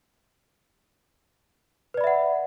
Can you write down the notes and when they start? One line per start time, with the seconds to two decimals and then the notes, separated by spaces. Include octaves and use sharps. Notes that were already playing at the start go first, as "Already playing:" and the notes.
1.94 B4
1.97 D5
2.01 B5
2.04 E5
2.07 F#5